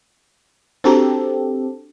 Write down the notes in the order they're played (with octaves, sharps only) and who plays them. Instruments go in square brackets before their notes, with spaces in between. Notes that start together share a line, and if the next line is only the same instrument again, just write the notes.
[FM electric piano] C4 G4 A4 [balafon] D4 F#4 A#5